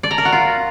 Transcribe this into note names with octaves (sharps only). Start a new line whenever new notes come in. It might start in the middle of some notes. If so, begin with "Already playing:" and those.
D5
A#5
A#4
F#4
F4